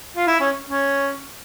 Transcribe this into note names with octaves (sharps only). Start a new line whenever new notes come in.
F4
E4
C#4
C#4